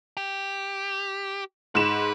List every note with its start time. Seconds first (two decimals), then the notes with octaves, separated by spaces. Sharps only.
0.17 G4
1.75 G#2 B4 E7